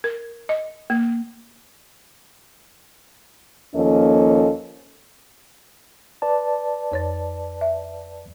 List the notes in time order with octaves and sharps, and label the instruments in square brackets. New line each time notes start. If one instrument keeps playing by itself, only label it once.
[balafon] A#4
D#5
A#3
[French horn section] D#2 F3 A#3 C#4 A4 D#5
[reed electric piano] B4 D5 A5
[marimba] F2 C#5 A6
E5